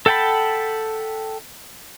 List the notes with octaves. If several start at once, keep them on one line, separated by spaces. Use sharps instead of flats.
A4 F#5 G5 A5 B5